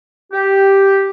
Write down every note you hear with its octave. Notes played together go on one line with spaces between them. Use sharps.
G4